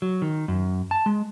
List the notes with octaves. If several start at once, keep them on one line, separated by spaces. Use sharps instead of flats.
F#3
D#3
F#2
A5
G#3